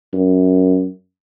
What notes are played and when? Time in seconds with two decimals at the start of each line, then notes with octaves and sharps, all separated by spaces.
0.13 F#2